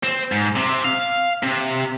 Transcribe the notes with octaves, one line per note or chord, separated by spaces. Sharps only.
C4
G#2
C3
F5
C3